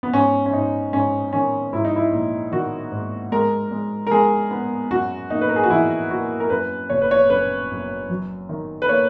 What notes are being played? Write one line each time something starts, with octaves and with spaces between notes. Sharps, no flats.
B3
G#2 C#4
C#4
G#2 D#4
G#2 C#4
D#3 C#4
G#2 E4
D#4
E4
A#1
D#3 F#4
G#2
G#3 A#4
G#3
A#4
G#3 G#4
B3
F#2 F#4
A#3 D#4
B4
A#4
G#4
F#4
E3 E4
A#3 F#4
A#4
F#2 B4
F#1 C#5
B4
C#5
F#2 B4
F#2
F#3
D#3
B4
A#3 C#5